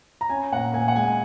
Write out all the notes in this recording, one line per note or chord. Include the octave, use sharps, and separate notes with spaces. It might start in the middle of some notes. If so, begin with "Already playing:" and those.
A#5
C#4 G#5
A#2 F#5
A#2 G#5
F#5
G#3 G#5